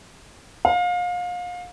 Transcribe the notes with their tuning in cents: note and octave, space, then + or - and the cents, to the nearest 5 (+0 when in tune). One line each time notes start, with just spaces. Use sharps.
F5 +30